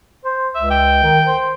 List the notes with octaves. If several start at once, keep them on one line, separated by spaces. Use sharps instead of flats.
C5
C#2 E5
G5
D#3
C5